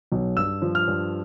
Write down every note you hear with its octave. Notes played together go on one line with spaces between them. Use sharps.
B1
G2 E6
F3
F6
G2